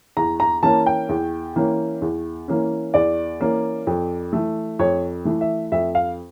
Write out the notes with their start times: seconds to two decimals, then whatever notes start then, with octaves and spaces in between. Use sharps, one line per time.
0.17 E2 A#5
0.40 A#5
0.63 E3 A#3 C#4 A5
0.86 G5
1.09 E2
1.56 E3 A#3 C#4
2.02 E2
2.48 E3 A#3 C#4
2.94 E2 D5
3.40 E3 A#3 C#4
3.87 F2
4.33 E3 A3
4.79 F2 C#5
5.25 E3 A3
5.41 E5
5.72 F2 E5
5.95 F5